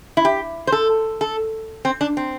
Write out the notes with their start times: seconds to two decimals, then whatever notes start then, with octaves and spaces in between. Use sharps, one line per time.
0.17 E4
0.25 G4
0.67 C5
0.72 A4
1.21 A4
1.85 C4
2.01 D4
2.17 C4